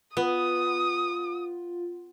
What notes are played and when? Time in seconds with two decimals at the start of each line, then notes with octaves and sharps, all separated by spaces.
0.17 B3 F4 D#6